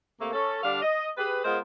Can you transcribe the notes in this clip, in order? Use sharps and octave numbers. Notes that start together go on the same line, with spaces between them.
C3 A3 A#3
C#4 A4
D3 G3 D4 F5
D#5
G4 G#4 B4
G#3 B3 F4 A#4 C5